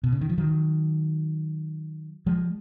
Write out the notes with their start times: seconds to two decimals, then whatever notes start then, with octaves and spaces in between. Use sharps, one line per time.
0.03 B2
0.12 C#3
0.21 D#3
0.29 F3
0.38 D#3 F#3
2.26 F3 G#3